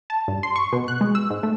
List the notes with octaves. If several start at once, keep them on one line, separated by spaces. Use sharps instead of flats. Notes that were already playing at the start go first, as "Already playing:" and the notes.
A5
G2
C6
C#6
B2
F#6
G#3
E6
G#2
A3